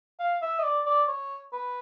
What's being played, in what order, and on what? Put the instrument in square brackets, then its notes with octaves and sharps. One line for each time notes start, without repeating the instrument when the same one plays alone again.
[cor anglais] F5
E5
D#5
D5
D5
C#5
B4